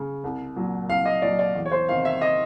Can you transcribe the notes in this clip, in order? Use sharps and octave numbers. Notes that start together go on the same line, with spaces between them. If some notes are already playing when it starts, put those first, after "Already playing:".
Already playing: C#3
C2
A#2 F#3
C2 F5
D#5
A#2 F#3 D5
D5
E2
C#5
C5
C3 D#3 F5
E5
D#5